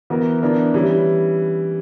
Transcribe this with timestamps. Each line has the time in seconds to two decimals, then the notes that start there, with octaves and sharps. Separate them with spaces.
0.10 E3 B3 F#4 A#4
0.42 E3 B3 D4 A#4
0.74 E3 G3 C#4 E4